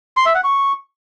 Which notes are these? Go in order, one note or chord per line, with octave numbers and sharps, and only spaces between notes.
C6
E5
F#5
C#6